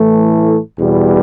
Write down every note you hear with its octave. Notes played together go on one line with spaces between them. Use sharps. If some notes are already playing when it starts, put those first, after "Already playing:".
Already playing: A2 E3 A3
E2 B2 G3 B3